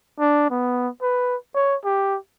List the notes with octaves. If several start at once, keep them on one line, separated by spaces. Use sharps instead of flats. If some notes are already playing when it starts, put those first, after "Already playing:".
D4
B3
B4
C#5
G4